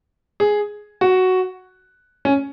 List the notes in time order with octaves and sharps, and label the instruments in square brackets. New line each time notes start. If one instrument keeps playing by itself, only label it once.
[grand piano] G#4
F#4
C#4